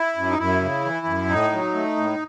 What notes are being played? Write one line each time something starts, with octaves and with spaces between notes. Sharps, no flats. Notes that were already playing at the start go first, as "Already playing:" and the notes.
Already playing: E4
F#2
D#4
F#2 E4
C#3
E3
F#2
A2 D#4
F#3
A3
A2